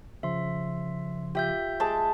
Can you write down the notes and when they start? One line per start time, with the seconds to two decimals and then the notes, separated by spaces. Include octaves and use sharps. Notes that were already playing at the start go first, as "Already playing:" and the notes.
0.23 C#3 F3 E5 C6
1.35 F4 G4 E5 G6
1.80 G#3 A5 D6